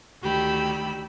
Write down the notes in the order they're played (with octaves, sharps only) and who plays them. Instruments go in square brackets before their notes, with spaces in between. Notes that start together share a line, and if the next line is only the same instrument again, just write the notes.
[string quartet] D2 D#3 G4 B5 E6